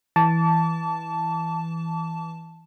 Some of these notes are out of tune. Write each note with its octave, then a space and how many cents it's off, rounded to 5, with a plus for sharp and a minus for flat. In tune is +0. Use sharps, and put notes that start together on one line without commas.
E3 +0 A5 +0 D6 -35